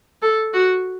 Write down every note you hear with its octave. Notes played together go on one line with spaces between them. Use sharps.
A4
F#4